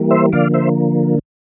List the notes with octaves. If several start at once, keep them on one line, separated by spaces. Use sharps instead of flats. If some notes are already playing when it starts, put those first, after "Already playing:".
Already playing: E3 G3 A#3
C5 E5
D3 F3 A#3 D5 F5
C5 E5